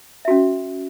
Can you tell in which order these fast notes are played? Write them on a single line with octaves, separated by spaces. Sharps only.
E5 F#4 C#4